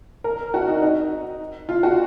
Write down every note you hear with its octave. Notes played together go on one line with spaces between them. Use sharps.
A#4
F#4
D#4
D#4
F4
F#4